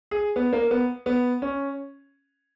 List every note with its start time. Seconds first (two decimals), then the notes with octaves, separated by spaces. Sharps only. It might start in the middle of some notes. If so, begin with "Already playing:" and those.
0.11 G#4
0.36 B3
0.53 A#3
0.71 B3
1.06 B3
1.42 C#4